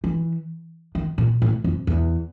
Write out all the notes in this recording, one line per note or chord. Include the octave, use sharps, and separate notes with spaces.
E3
D#3
A#2
A2
F2
E2